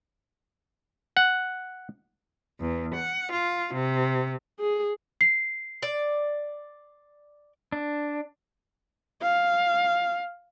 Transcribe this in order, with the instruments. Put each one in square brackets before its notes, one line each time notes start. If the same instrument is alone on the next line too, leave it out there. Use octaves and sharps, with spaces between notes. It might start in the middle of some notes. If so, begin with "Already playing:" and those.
[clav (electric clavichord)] F#5
[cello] E2
F#5
F4
C3
[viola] G#4
[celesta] C7
[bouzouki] D5
[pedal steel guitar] D4
[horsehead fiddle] F5